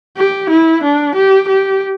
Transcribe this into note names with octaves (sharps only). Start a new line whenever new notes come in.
G4
E4
D4
G4
G4